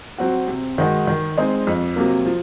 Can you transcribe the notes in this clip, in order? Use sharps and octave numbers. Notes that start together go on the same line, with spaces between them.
F#3 C4 F#4
C3
D#3 G#3 D#4 F#4
D#3
G#3 C4 D#4
F2
C3 F#3 A#3
F3